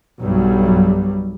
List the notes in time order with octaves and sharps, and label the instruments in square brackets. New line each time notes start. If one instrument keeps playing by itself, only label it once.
[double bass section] B1 G2 F#3 G3